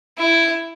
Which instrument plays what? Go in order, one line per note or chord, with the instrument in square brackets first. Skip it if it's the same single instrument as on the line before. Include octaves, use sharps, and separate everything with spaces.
[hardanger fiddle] E4